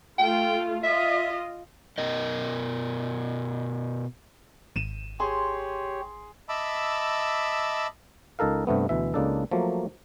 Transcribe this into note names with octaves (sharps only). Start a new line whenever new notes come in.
A3 F4 G5
F4 D#5 E5
B2 A#4 D#5
G#1 D#7 E7
G4 G#4 C#5 C6
D#5 E5 A5 B5 D6 E6
C#2 D#4 A4 A#4 F5
G2 C3 A3 B3
D2 B2 E3 E5
C#2 C#3 A#3 D4 D#4 A4
F3 F#3 A3 A#3